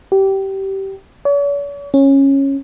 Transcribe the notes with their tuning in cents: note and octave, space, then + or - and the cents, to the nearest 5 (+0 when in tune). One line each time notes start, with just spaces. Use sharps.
G4 -20
C#5 +45
C#4 -15